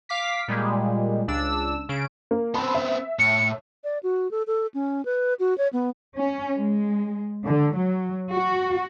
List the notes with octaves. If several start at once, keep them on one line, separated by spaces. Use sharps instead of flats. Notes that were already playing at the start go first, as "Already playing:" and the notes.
F5 D6 B6
A#2 G3 G#3
C#2 D4 E6
C#3 D7
A#3
B3 C4 A5 B5 C6
E5
A2 C#7
D5
F#4
A4
A4
C#4
B4
F#4
C#5
B3
C#4
G#3
D3
F#3
F#4